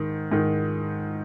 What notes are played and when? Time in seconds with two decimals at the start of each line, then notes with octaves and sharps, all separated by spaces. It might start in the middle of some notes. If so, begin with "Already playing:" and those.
Already playing: G#2 D#3
0.31 G#2 D#3